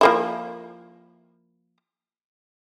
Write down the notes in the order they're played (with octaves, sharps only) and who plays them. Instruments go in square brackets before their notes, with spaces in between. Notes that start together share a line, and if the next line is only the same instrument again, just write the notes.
[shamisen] F3 A#3 E4